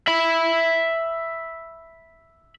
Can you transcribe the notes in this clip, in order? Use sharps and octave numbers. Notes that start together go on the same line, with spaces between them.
E5 B5